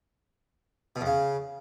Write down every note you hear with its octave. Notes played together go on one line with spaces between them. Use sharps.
B2
E2
C#3